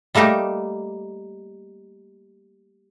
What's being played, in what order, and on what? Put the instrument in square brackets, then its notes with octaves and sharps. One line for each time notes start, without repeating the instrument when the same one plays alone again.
[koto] G3 A3 A#3 D#4 G4